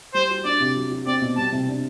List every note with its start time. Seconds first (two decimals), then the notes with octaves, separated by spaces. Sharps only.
0.14 G3 C5
0.30 F#4
0.45 D4 D5
0.60 C3
0.76 F#3
0.91 F#4
1.06 C4 D5
1.21 B2
1.37 G3 A5
1.52 C3
1.68 D4